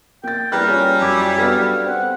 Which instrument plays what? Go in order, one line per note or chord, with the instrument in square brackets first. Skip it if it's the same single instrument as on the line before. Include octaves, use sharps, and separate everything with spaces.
[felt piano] A#3 A6 [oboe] G5
[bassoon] E2 [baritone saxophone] G3 [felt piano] A#3 F#6 [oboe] A#4
[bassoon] C#4 [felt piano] F4
[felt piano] F#2 D6 [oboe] E4
[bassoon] G2 [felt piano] B3 F#4 A4 [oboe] F5
[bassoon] C4 [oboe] F#5